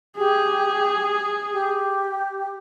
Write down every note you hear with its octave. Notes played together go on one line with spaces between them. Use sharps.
G4 G#4
G4